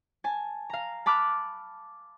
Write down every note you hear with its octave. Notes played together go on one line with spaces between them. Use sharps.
G#5 A5
F5 A#5
A5 B5 D6 F6 F#6 A6